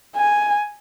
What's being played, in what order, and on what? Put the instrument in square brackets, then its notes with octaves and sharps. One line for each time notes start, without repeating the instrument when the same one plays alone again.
[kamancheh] G#5